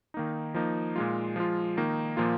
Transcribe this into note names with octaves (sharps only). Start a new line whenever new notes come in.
D#3 A#3 D#4
F3 A#3 D#4
A#2 G#3 F4
F3 G#3 F4
D#3 A#3 D#4
A#2 F3 A#3 F4